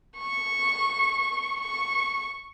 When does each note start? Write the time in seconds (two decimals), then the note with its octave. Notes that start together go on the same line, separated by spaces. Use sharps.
0.18 C#6
1.60 C#6